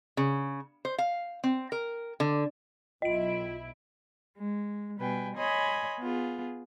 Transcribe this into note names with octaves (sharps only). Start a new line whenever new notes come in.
C#3
C5
F5
C4
A#4
D3
B1 E4 F4 D#5 D7
G#3
B2 G3 B4 G5 G#5
C#5 D#5 G#5 B5 C6 D#6
B3 F4 G#4